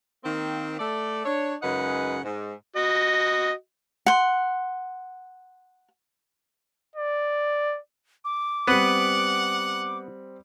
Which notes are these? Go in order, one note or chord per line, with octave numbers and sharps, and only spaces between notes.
D#3 A#3 C4
A3 A4 D5
D4 C#5
F#2 C#3 G#3 D#4 B4 F#5
G#2
F#4 D#5
F#5 C6
D5
D6
G3 B3 C4 B4 F#5